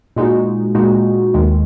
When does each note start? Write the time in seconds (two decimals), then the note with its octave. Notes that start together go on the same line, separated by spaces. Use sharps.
0.16 A#2 G#3 D#4 F#4
0.75 A#2 G#3 D#4 F#4
1.34 D#2 D#3 G#3